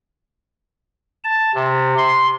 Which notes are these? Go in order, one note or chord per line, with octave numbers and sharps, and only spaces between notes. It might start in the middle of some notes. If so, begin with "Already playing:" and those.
A5
C3
C6